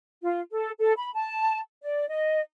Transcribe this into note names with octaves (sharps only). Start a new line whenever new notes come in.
F4
A4
A4
B5
A5
D5
D#5